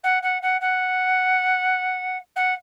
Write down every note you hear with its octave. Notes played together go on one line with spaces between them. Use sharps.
F#5
F#5
F#5
F#5
F#5